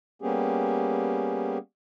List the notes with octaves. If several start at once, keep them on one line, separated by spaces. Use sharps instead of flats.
G3 A#3 B3 C#4 G4 G#4